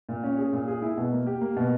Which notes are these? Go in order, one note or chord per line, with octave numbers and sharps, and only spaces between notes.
A#2
C#4
G#4
A#2
G#4
E4
B2
A#3
G4
A#3
B2